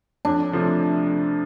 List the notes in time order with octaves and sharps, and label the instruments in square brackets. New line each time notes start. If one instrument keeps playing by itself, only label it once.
[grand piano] F2 [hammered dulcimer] D4
[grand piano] C3 F3 A3